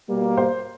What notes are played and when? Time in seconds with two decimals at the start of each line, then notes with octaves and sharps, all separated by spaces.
0.08 B2 G3 A#3
0.37 C5